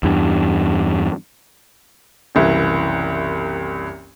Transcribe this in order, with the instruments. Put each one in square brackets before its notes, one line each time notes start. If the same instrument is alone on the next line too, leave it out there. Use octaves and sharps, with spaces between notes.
[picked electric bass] E2 G2
[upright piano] F#1 C2 E3